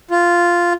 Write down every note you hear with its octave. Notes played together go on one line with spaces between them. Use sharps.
F4